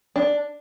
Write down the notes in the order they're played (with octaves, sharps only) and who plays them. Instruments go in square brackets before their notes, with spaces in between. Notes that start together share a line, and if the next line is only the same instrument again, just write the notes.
[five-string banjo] D4